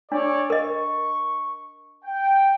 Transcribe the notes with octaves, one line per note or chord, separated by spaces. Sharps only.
D4 A4 C#5 D5
A#4 D#5 C#6
G5